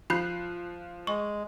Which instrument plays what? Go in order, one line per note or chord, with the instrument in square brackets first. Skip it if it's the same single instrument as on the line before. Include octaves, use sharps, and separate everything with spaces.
[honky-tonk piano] F3 F#6 C7 [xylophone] B5 G6
[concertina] G#3 [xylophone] C#6